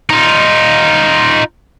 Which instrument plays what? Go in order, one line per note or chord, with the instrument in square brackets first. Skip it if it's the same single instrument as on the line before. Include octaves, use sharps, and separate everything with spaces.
[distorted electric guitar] D#4 F4